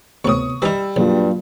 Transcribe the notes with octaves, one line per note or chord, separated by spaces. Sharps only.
D2 A2 C3 B3 C#6 D#6
E3 G3 D#4 E6
A#1 G2 F#3 A#3 F4